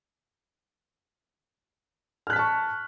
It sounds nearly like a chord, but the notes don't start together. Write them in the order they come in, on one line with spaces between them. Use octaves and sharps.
F6 F#6 B6 A5 C#6